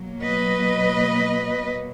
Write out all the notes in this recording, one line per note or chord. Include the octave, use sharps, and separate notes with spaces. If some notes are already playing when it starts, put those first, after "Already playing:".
Already playing: B2 F#3 A#3
B4 D#5